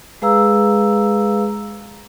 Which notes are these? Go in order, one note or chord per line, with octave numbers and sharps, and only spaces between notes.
G#3 G#4 B4 F5 A#5 E6